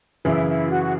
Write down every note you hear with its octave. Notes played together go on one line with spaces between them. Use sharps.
F#2 C#3 E3 E4
E4
F#4